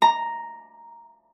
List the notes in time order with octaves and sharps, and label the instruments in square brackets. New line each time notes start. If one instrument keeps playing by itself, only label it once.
[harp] A#5